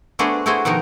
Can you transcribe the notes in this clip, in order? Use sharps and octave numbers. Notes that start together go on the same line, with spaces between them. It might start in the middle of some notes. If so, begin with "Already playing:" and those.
A3 B3 D4 F#4 G#4 C5
A3 E4 F#4 G#4 C5
B2 D#3 F3 D#4 A#4